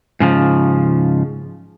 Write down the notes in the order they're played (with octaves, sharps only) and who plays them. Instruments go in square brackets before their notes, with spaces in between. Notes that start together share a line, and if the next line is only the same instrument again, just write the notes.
[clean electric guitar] G#2 C#3 F3